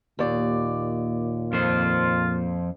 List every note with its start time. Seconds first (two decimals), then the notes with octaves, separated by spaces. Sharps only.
0.19 D#2 A#2 D5
1.53 F2 F4 C5